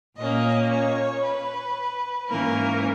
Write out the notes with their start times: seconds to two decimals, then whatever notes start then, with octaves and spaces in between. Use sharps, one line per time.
0.17 A#2 A#3 C#4 D#5
0.70 C#5
1.23 B4
2.28 G#2 E3 A#3 C#4 A#4